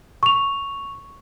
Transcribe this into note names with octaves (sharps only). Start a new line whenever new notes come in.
C#6 F7